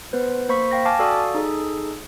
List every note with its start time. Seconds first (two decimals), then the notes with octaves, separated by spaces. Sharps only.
0.13 B3 B4 C5
0.49 A#3 C5 B5 C#6 B6
0.71 F5 G5 A#6
0.85 F5 G#5 A5 D6 F6
0.99 F#4 A4 D5 F5 C#6 D#6
1.35 D#4 G#4 A4